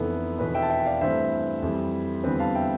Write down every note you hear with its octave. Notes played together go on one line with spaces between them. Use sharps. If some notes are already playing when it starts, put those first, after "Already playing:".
Already playing: F1 F2 E3 B3 A4
F1 E2 B2 B4
E5 G5
A5
E5 G5
G5
D5 F5
G2 E3 A3 C4 C5 E5
F2 E3 G3
E2 D3 G3 C4 B4
F5 A5
E5 G5